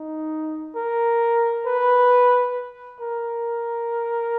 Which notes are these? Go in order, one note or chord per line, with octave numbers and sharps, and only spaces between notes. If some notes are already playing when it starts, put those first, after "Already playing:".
Already playing: D#4
A#4
B4
A#4